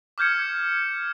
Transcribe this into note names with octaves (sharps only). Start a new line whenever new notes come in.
D6 F6 G6 G#6 C#7